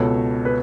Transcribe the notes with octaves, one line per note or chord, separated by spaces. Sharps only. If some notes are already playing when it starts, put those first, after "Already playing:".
Already playing: C#2 B2 A4 C#5
B4